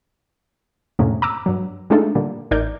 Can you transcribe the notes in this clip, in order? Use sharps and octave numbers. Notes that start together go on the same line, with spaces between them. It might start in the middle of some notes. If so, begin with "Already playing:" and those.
F2 A2 C3 A#3 C#4
A#5 D6 E6
G2 F#3
G#3 A3 D4 D#4 F4 A4
A#2 D3 G3 A#3
A1 D#4 A#4 D5 G6